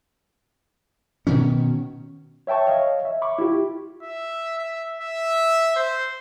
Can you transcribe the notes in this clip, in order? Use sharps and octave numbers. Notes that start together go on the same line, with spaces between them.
B2 D#3 C#4
C#5 E5 G5 A5 C#6
C#5 D#5 F5
E5
B5 C#6 D6
E4 F4 G4
E5
E5
E5
C5